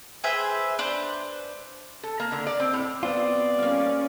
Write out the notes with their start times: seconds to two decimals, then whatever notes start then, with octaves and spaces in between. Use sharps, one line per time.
0.24 G#4 B4 C5 E5
0.79 D4 B4 C5
2.03 A4
2.20 A#3
2.32 D3
2.47 D5
2.60 C4
2.73 A2
3.03 B3 C4 F4 D5
3.58 G3 A#3 C#4 F5